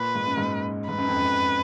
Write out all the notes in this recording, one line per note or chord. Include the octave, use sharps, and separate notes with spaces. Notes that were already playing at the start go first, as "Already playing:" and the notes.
Already playing: A#2 B4
G#2
F#2
G#2
G#2 B4
F#2
F2
F#2